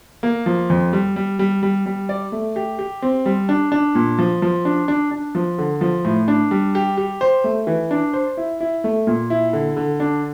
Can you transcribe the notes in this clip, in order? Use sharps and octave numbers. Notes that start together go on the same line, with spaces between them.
A#3
F3
F2
G3
G3
G3
G3
G3
D5
A3
G4
G4
C4
G3
D4
D4
A#2
F3
F3
D4
D4
D4
F3
D3
F3
A2
D4
G3
G4
G4
C5
A3
E3
D4
C5
E4
E4
A3
A#2
E4
D3
D3
D4